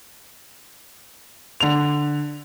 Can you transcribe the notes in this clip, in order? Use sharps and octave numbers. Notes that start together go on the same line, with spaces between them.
D3 F7